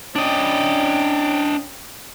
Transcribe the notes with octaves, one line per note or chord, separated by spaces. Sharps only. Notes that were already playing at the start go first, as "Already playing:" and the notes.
C#4 D4 D#5 G5